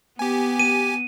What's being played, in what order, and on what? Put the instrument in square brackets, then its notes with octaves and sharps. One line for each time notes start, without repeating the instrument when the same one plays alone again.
[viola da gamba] B3 [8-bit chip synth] G4 G#5
[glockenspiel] D#7